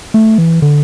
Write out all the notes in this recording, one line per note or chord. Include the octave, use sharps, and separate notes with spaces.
A3
E3
D3